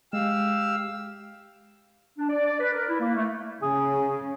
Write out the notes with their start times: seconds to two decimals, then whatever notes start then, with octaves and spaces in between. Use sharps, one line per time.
0.13 G#3 G4 F5 E6
2.18 D4
2.29 D5
2.46 D5
2.60 B4
2.72 A#4
2.88 E4
3.00 A#3
3.15 A3
3.62 C#3 G#4